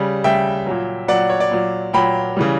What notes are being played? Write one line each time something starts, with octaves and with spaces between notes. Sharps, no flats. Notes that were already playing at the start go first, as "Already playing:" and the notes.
Already playing: C#3 G3
C#3 G3 E5 G5
A#2 F#3
A#2 F#3 D5 F#5
C#5
D5
A#2 F#3
A#2 F#3 G5 B5
C#3 E3 G3